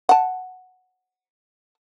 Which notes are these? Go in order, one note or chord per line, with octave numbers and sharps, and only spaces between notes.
F#5 A5